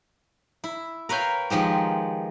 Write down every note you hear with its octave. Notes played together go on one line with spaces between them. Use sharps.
E4
A#4 B4 C#5 F5 G5 C6
D#3 F3 G#3 G4